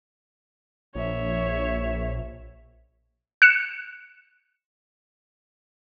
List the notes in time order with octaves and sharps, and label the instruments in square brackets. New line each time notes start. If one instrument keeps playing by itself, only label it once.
[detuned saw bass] A#1 [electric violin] C#5 E5
[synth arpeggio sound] F#6 C#7 E7